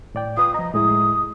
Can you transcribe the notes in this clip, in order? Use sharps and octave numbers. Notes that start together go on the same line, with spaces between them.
A2 D5 G5
F4 B4 D#6
F3 D#5 A#5
A2 G#3 E4 D#6